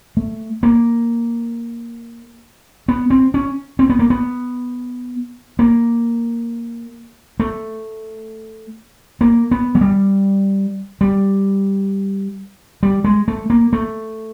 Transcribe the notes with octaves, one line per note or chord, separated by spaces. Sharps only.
A3
A#3
B3
C4
C#4
C4
B3
A#3
B3
A#3
A3
A#3
B3
F#3
G3
G3
G3
G#3
A3
A#3
A3